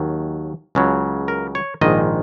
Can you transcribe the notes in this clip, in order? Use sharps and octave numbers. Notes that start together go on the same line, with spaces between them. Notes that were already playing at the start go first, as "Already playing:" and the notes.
Already playing: D#2 D#3 F#3
C#2 C#3 F#3
A#4
C#5
A#1 G#2 D#3 G#3 D#5